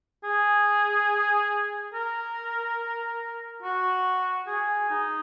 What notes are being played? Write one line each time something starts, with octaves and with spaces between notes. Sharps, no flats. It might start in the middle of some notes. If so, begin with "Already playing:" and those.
G#4
A#4
F#4
G#4
D#4